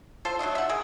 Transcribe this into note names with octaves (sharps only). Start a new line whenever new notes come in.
F4 A4 C5
F#3 A3 D4 D#4
E5 F#5
G#4 A#4